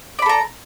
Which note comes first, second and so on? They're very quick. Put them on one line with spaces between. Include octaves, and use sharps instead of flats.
D5 B5 A4 A#5